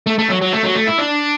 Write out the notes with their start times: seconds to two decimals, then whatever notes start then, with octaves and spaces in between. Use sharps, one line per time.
0.07 A3
0.19 A3
0.30 F#3
0.42 F#3
0.53 A3
0.64 F#3
0.75 A3
0.88 E4
0.99 D4